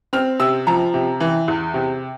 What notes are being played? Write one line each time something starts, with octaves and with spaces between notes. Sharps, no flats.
C4 F6
C3 E6
F3 A#5
C3
E3
E2
C3